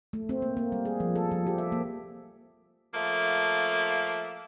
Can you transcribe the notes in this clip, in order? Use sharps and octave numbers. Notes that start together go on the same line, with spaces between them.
A3
C4
A#3
A#3
G3
G#4
F3
A4
F3
G4
E5
A#3
F3 A3 A#3